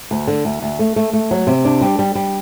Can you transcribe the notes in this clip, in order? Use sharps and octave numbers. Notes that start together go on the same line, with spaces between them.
D2
D3
D2
D2
A3
A3
A3
F#3
C3
D4
G3
G3
G3